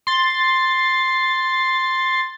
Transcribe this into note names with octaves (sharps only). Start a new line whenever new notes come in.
C6 A6